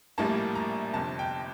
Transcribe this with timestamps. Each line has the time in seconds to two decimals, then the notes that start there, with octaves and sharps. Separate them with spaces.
0.18 A#1 A2 G3 A#3 A5
0.55 A#5
0.93 G1 F2 C3 A5
1.19 G5